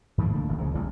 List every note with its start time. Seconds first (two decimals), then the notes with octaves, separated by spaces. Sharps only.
0.18 G#2 D#3 F3 A#3
0.34 C2 D3 A3 A#3
0.48 D#1 A1 D#3
0.59 C#2 C#3 F3
0.74 A1 D#2 A2 G3